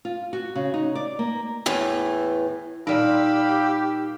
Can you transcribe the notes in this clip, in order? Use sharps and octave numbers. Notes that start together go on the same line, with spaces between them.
F4
F#4
C#3
D#4
D5
A#3
E2 A2 E3
A#2 G3 D#4 G4 A#4 F5 B5 E6